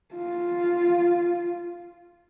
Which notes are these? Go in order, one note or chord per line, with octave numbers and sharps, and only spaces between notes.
F4